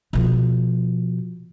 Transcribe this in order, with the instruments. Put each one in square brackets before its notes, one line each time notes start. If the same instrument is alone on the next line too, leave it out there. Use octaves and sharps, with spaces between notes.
[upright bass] B2 F3